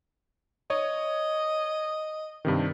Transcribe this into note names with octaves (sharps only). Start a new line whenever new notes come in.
C#5 D#5
G2 C3 D#3